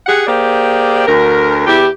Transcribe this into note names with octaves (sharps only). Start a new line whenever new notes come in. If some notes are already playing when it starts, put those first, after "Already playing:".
G4 G#4 F#5
A#3 G4 G#4 C5 D5
D2 A#4
E2 E4 G4